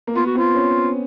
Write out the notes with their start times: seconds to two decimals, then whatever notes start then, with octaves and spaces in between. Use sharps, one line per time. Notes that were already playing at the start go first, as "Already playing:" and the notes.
0.07 A#3
0.15 B3 F4
0.26 F#4
0.35 C4 F4
0.55 C#4